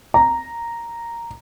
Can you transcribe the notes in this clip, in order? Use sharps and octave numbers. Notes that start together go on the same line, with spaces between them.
A#5